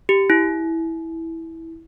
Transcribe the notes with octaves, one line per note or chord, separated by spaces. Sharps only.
G4
E4